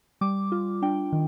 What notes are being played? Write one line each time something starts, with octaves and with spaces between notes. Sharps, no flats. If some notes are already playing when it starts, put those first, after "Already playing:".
G3 D6
F4
D4 G5
D#3